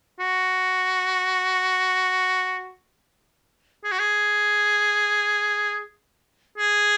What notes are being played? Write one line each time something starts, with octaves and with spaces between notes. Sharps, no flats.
F#4
G#4
F#4
G#4
G#4